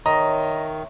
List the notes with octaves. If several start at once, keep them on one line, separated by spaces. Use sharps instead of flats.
D#3 C#5 D#5 E5 A#5 C6